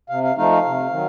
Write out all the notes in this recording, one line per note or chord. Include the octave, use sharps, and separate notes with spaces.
C3 F5
F5
F3 A3 D#4 F5
F5
C3
D#3 F#3